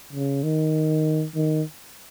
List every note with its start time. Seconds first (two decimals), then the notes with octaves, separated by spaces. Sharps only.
0.13 C#3
0.43 D#3
1.35 D#3